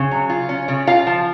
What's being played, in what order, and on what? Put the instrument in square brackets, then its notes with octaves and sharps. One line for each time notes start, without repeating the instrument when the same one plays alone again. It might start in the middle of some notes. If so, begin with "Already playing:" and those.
Already playing: [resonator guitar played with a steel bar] C#3
F#3
F4
C#4
C#3
F4 F5
F3